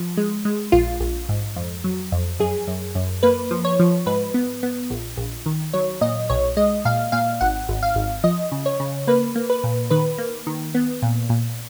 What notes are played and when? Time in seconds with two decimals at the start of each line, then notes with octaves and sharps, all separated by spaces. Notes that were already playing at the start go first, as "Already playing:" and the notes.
Already playing: F3
0.17 G#3
0.45 G#3
0.72 A#1 F4
1.00 A#1
1.29 G#2
1.56 F2
1.84 F#3
2.12 F2
2.40 F#2 G#4
2.67 F#2
2.95 F#2
3.23 A#3 B4
3.51 F3
3.65 C#5
3.79 F3
4.06 G#2 B4
4.34 B3
4.63 B3
4.90 A#1
5.17 A#1
5.46 D#3
5.73 F#3 C#5
6.01 A#2 D#5
6.30 B1 C#5
6.57 G#3 D#5
6.85 A#2 F5
7.12 A#2 F5
7.41 G#1 F#5
7.69 G#1
7.83 F5
7.96 G#1
8.24 F3 D#5
8.52 C#3
8.66 C#5
8.80 C#3
9.07 A#3 B4
9.35 A#3
9.50 B4
9.64 A#2
9.90 D#3 B4
10.18 A#3
10.47 D#3
10.75 B3
11.02 A#2
11.29 A#2